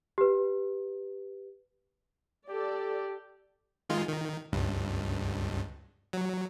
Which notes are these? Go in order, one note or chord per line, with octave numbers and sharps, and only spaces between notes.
G4 B4
G4 A4 D5
D#3 G#3 F4
D#3
C#2 G2
F#3